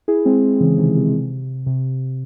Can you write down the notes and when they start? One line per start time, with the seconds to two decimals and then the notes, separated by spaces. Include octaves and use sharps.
0.08 E4 G#4
0.25 G#3 C4
0.60 C#3 E3
0.78 C3 D#3
0.96 C3
1.66 C3